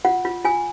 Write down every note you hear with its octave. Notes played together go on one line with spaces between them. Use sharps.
F4 F#5
F4
F4 G#5